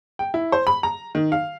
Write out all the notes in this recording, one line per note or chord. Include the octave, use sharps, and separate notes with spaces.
G5
E4
C5
B5
A#5
D#3
F5